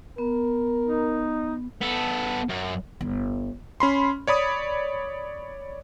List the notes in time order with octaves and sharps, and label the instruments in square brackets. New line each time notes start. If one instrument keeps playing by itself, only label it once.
[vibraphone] B3 [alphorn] A#4
[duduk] D#4
[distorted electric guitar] B3 A4
F#2
[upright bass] G1
[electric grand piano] C#4 B5 C6
C#5 D5 B5 D#6